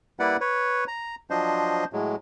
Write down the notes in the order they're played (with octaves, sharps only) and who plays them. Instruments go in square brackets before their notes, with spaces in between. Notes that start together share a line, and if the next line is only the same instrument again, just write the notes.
[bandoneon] G3 A#3 E4 B4 D5 F#5
B4 C#5
A#5
F3 F#3 D4 C5 D#5
A2 F#3 G#3